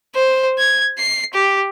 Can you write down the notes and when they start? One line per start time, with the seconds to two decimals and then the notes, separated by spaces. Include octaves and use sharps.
0.15 C5
0.58 G#6
0.98 C7
1.33 G4